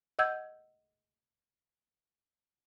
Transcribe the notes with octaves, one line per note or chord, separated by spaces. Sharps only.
D#5 F#5 E6 G6 G#6